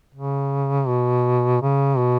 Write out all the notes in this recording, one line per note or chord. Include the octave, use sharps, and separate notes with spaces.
C#3
B2
C#3
B2